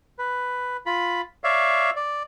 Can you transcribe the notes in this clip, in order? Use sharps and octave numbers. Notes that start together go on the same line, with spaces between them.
B4
F4 B5
C#5 D5 E5 F5
D5